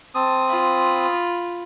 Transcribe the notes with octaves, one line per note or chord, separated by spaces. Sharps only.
C4 A5 D#6
F4 B5